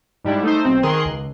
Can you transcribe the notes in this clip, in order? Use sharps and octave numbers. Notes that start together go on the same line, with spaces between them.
G#2 G3 D4 E4
A3 D#4 C5
B1 C4
D#3 G#4 A#4 C6 F#6
C#2